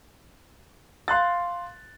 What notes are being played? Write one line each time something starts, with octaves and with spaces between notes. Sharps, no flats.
F5 C6 F#6 A6